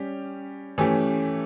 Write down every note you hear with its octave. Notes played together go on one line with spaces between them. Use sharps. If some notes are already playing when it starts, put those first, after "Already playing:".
Already playing: G3 C#4 G4
E3 A3 C#4 G4